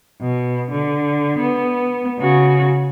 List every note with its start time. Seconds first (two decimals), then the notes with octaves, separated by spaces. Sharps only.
0.22 B2
0.71 D3
1.38 B3
2.19 C#3 F#4